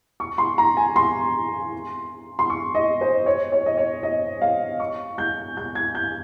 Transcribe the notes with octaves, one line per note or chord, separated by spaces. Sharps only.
C#6
C6
A#5
G#5
C6
C6
C#6
D#5
C5
C#5
C#5
D#5
C#5
D#5
F5
C#6
G6
G6
G#6
G6